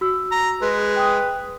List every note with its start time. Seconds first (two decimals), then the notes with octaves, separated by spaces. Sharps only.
0.01 F#4 E6
0.32 A#5
0.62 G#3 B4
0.96 G5 D#6